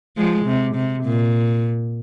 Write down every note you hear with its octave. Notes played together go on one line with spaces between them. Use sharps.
F3 G#3
C3
C3
A#2